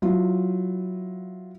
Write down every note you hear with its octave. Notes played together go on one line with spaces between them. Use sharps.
F#3 E4 F4